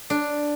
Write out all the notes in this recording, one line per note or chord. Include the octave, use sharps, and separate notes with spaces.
D4